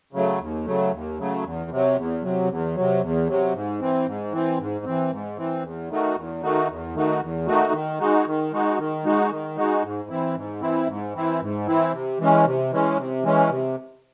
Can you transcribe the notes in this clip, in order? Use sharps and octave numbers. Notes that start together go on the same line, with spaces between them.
C#3 F#3 A3
D#2
C#3 F#3 A3
D#2
C#3 F#3 A3
E2
C3 F#3
E2
C3 F#3
E2
C3 F#3
E2
C3 F#3
G#2
E3 C4
G#2
E3 C4
G#2
E3 C4
G#2
E3 C4
E2
D#3 A3 D#4 F#4
E2
D#3 A3 D#4 F#4
E2
D#3 A3 D#4 F#4
E2
D#3 A3 D#4 F#4
D#3
G#3 D#4 F#4
D#3
G#3 D#4 F#4
D#3
G#3 D#4 F#4
D#3
G#3 D#4 F#4
G#2
E3 C4 E4
G#2
E3 C4 E4
G#2
E3 C4 E4
G#2
E3 C4 E4
C3
E3 G#3 C#4
C3
E3 G#3 C#4
C3
E3 G#3 C#4
C3